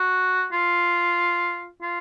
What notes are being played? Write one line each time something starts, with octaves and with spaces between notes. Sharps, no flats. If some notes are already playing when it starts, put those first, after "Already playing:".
Already playing: F#4
F4
F4